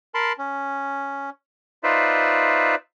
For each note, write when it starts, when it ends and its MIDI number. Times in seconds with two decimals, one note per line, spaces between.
0.14 0.33 70
0.14 0.33 81
0.14 0.33 83
0.14 0.33 84
0.38 1.30 61
1.83 2.75 63
1.83 2.75 65
1.83 2.75 71
1.83 2.75 72
1.83 2.75 74
1.83 2.75 76